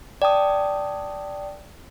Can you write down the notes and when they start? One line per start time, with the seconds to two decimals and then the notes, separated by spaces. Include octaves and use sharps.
0.22 D5 G5 A5 D#6